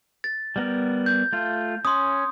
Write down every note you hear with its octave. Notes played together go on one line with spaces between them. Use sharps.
A6
G3 B3 A#4
G6
A3 F4
C#4 C6 D#6